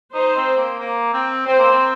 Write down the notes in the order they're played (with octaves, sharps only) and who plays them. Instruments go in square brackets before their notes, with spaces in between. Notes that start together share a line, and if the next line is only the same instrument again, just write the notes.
[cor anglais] D#4 [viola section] C5
[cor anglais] C4
A#3
A#3
C4
[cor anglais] C4 [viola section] C5
[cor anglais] A#3
C4